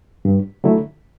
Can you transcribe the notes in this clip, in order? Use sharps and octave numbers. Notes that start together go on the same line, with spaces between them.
G2
D3 F#3 A3 E4